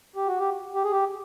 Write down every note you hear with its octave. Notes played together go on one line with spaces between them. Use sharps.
G4
F#4
G4
G4
G#4
G4